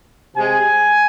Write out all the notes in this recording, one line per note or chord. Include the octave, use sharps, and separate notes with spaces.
C3 G#3 G#5